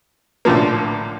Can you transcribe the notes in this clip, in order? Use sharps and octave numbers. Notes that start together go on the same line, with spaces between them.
A#1 A2 D3 F3 A#3